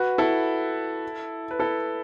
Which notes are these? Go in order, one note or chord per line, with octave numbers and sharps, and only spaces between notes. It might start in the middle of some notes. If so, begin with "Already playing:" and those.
Already playing: F#4 B4
E4 A4
B4
E4 A4